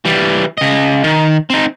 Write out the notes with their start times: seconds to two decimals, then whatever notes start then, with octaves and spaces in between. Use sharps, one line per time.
0.05 E3 G3
0.58 C#3 D#5
1.04 D#3
1.50 C4 D#4